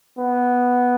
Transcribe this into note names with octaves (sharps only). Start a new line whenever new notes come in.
B3